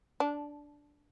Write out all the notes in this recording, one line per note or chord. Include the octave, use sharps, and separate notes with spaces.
D4